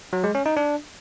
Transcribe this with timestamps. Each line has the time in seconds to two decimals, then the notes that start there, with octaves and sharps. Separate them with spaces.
0.13 F#3
0.24 G#3
0.35 C#4
0.46 D#4
0.57 D4